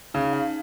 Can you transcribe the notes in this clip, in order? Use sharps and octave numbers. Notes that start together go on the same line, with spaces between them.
C#3 D#4
F5